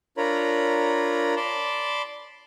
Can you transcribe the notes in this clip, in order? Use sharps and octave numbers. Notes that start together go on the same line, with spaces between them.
D4 F4 A#4 C#5 A#5 B5
D5 A5 B5 C6 D6